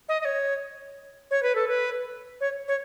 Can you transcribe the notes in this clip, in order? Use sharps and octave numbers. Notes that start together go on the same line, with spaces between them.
D#5
D#5
C#5
C#5
B4
A4
B4
C#5
C#5